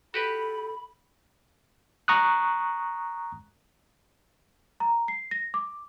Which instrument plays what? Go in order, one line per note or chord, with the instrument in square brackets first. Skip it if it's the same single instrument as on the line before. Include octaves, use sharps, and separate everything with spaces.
[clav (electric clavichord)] F#4 G4 B4 [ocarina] A4 [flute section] B5
[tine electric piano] A#5 C#6 D#6 F#6
[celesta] A#5
C7
A#6
D6